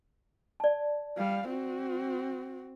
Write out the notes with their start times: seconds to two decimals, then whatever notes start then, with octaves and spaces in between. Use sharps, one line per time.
0.60 D5 A5
1.17 G3 F5
1.48 C4 F#4